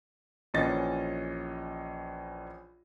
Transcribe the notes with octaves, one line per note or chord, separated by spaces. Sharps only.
A#1 E3 C#4 D#5 A6